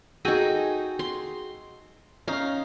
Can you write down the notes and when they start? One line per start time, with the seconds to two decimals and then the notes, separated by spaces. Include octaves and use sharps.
0.25 D#4 F#4 G#4 A4 G5
0.99 C6
2.28 C#4 D#4 F5